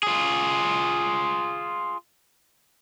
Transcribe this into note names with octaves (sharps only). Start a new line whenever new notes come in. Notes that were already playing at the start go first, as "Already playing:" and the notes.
F4 G#4